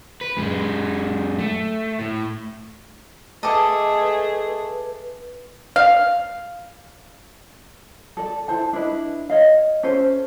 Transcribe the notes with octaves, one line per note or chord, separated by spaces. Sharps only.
B4
F#2 G#3
A3
A2
A3 G#4 A4 B4 D#5 A5 D6
F5
A4 D5
E4 A4 C5 A5
D4 E4 B4 D#5
C#5 D#5 F5
C#4 A4 C5